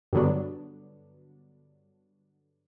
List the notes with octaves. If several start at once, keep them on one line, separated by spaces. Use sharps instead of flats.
G2 D3 F#3 B3 D4